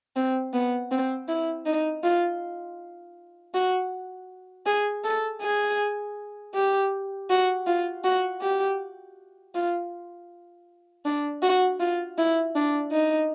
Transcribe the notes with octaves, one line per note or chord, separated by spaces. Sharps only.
C4
B3
C4
E4
D#4
F4
F#4
G#4
A4
G#4
G4
F#4
F4
F#4
G4
F4
D4
F#4
F4
E4
D4
D#4